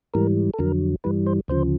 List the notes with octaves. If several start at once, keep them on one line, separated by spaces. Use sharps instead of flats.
G#2 E3 G3 A#4
A4
F2 D3 F#3 A#4
G2 E3 G3 B4
C5
D2 C#3 F3 C5